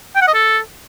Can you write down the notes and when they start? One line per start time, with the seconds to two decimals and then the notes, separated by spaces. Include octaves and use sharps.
0.15 G5
0.21 F#5
0.27 D#5
0.34 A4